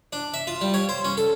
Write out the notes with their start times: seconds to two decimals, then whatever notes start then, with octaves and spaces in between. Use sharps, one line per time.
0.13 D4
0.34 E5
0.47 F4
0.61 G3
0.74 C#5
0.89 C5
1.04 C#4
1.17 A4